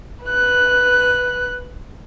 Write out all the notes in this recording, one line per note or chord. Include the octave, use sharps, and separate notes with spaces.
B4 F#6